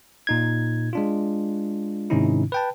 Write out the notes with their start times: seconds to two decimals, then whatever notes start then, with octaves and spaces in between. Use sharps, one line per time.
0.27 A#2 D#4 G#6
0.93 G#3 D4 F4
2.10 G#2 C3 D#3 C#4 D#4 E4
2.52 B4 G5 A5